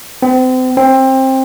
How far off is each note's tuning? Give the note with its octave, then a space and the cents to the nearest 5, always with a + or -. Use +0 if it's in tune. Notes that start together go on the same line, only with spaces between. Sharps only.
C4 -35
C4 +20